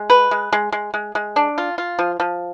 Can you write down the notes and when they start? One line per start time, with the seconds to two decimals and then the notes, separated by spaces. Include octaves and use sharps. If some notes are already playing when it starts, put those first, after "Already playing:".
Already playing: G#3
0.10 B4
0.31 G#3
0.53 G#3
0.72 G#3
0.94 G#3
1.15 G#3
1.36 D4
1.58 F4
1.78 F4
1.99 F3
2.20 F3